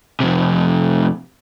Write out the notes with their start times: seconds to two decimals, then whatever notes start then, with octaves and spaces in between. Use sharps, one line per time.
0.20 F2 C3